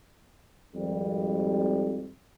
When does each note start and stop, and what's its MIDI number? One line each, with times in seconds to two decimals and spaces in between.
0.75 2.11 32
0.75 2.11 41
0.75 2.11 55